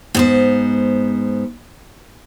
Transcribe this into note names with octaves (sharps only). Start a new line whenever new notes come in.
G#2 B3 C5